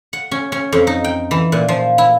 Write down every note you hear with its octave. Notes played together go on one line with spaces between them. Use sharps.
F#5
C#4
C#4
F2
D#4
G5
E3
A#2
F3
E4